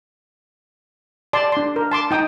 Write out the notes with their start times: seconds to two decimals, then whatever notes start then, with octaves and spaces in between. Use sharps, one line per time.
1.33 D5 A5 C6
1.52 D4 C6
1.76 A#4
1.91 A5 C6 D6
2.11 D#4 G5 D#6